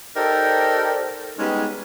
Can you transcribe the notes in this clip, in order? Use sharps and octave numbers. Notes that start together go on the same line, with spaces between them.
D#4 G4 A4 A#4 C5 D5
G3 G#3 B3 C#4 D#4